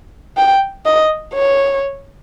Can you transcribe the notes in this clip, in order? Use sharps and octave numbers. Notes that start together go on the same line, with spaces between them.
G5
D#5
C#5